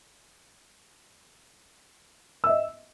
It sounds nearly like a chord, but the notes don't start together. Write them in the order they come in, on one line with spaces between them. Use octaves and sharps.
E6 E5 D#5